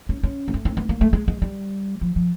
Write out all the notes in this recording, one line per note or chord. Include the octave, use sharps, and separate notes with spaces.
C#4
C#4
A#3
A3
C4
B3
A#3
A3
G#3
G#3
G3
F3
F3